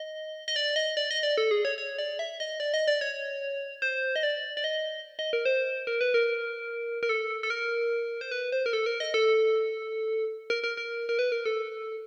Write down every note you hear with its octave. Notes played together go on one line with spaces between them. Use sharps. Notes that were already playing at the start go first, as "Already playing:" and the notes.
Already playing: D#5
D#5
D5
D#5
D5
D#5
D5
A4
G#4
C#5
C#5
D5
E5
D#5
D5
D#5
D5
C#5
C5
D#5
D5
D5
D#5
D#5
A#4
C5
A#4
B4
A#4
A#4
A4
A4
A#4
C5
B4
C5
A#4
A4
A#4
D#5
A4
A#4
A#4
A#4
A#4
B4
A#4
A4